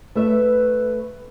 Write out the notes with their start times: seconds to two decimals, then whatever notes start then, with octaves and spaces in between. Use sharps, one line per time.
0.15 A3 B4 E5